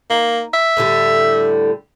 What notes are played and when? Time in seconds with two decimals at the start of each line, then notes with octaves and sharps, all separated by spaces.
0.10 A#3 D#4
0.54 E5
0.77 A2 D3 G3